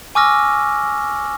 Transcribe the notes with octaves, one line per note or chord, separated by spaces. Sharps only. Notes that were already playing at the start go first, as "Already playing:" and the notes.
G#5 C#6 D6 E6 F6 A#6